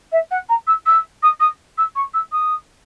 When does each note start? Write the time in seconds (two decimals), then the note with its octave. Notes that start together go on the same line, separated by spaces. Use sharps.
0.12 E5
0.31 F#5
0.49 A#5
0.67 E6
0.86 E6
1.22 D#6
1.40 D#6
1.77 E6
1.95 C#6
2.13 E6
2.32 D#6